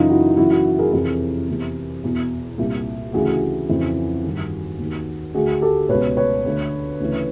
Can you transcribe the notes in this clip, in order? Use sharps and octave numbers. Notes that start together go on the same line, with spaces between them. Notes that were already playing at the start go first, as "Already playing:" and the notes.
Already playing: F#2 C#3 E3 D#4 F4
E4 F#4
F#2 C#3 E3 E4 F#4
E4 F#4
G#4 A#4
F2 C3 E3 G#4 A#4
E2 C3 E3
E2 B2
C2 A#2
D2 C#3 E3 F#4 G#4
F2 C#3 E3
G2 D#3
D#2 D#3
D2 D3 F#4 G#4
G4 A4
C#2 B2 B4 C#5
B4 C#5
D2 D3
D2 C#3 E3